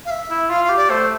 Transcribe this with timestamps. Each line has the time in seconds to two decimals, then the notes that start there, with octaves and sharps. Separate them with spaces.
0.05 F5
0.10 E5
0.31 E4
0.50 F4 F5
0.64 F5
0.70 G4
0.76 D5
0.90 A3 C5